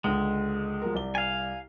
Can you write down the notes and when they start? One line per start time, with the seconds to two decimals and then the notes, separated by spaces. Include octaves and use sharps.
0.04 C#2 D3 G#3
0.82 F3 F#3 A#4
0.94 C2 D5 G7
1.15 F5 G#5